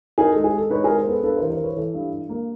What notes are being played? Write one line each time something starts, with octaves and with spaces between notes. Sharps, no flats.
D#4 G#4 A#4
G#3 A4
G#4
G#3 A4
D#4 B4 C#5
G#3 G#4 A#4
A#4 C5
B3 A4 B4
G2 A4 B4
E3 A#4 C5
A#4 C5
E3
B4 C#5
E3 A4
G2
G2
A#3